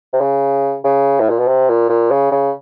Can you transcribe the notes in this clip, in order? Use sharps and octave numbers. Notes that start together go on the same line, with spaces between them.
C3
C#3
C#3
A2
A#2
B2
C3
A#2
A#2
C#3
C#3